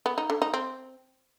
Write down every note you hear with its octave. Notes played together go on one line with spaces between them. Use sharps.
B3
D#4
D3
D#4
C4